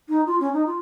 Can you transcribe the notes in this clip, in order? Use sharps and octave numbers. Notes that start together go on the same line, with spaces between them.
D#4
F4
C#4
D#4
F4